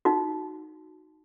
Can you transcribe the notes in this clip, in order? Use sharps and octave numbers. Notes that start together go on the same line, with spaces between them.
D#4 F#4